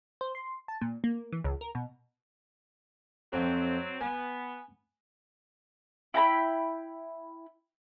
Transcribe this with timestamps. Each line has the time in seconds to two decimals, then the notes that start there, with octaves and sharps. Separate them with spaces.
0.21 C5
0.35 C6
0.68 A5
0.81 A#2
1.04 A#3
1.32 E3
1.44 C#2
1.61 A#4
1.75 B2
3.33 F2 F#3 C4
4.01 B3 G#5
6.14 E4 G5 A#5 B5